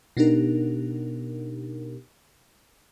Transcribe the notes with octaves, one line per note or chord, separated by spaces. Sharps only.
B2 B3 D4 D#4 G4 A#4